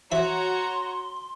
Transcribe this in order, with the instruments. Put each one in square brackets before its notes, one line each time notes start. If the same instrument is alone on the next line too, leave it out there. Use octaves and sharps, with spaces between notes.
[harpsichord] E3 E5 [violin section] F#4 C#5 A#5 [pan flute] C6